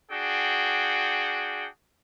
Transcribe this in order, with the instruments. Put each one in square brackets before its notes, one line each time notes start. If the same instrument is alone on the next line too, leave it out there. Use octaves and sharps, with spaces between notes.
[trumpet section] D4 F#4 G#4 G5